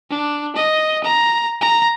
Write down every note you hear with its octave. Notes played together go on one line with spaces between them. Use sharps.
D4
D#5
A#5
A#5